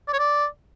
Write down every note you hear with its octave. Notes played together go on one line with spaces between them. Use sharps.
D5
C#5
D5